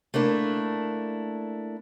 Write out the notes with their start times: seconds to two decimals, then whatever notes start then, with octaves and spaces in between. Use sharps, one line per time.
0.14 A3 A#3 D4 E4